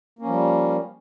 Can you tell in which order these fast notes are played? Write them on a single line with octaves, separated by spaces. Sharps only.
A#3 C#4 F3 G3